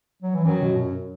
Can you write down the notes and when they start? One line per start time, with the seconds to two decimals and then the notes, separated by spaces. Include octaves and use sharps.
0.22 F#3
0.35 E3
0.45 F#2 D#3 F#3
0.61 B2
0.77 F#2